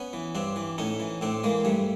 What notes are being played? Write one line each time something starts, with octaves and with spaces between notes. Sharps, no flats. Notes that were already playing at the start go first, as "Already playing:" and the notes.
Already playing: B3 C#4
E3
G2 C4 D4
E3
A2 C#4 D#4
E3
A2 C4 D4
E3 G#3 A#3
G2 G3 A3